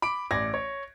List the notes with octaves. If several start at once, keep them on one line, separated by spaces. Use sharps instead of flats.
B5 D6 D7
A1 D5 G#6 A#6
C#5